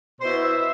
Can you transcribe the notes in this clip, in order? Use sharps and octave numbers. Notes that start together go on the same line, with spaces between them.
B2 B3 E4 C5
E5